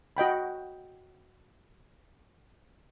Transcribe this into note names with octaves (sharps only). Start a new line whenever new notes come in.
F#4 D#5 G5 B5